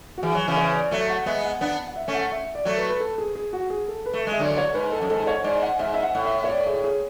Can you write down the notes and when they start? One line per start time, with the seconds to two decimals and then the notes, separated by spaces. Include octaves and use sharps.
0.18 F#4
0.23 E3 G#4
0.35 F#3
0.48 C#3 E3
0.57 C#5
0.75 D5
0.91 F#3 A3 E5
1.09 F#5
1.26 G#3 B3 E5
1.44 F#5
1.61 B3 D4 F#5
1.87 F#5
1.96 E5
2.08 A3 C#4
2.14 F#5
2.32 E5
2.55 D5
2.65 F#3 A3
2.77 B4
2.89 B4
3.00 A4
3.18 G#4
3.35 G#4
3.53 F#4
3.70 G#4
3.88 A4
4.06 B4
4.14 A3
4.27 G#3
4.32 E5
4.39 D3 F#3 D5
4.53 D5
4.57 C#5
4.74 G#2 B4
4.92 A4
5.01 F#2
5.10 G#2 A4
5.27 C#5
5.44 G#2 D5
5.62 F#5
5.79 G#2 E5
5.94 E5
6.03 F#5
6.15 A2
6.25 E5
6.44 C#5
6.49 D5
6.67 G#4
6.84 G#4